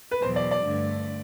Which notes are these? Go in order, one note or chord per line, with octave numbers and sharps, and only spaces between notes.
B4
E2 B2 F#3 C5
D5
D5
G2 D3 A3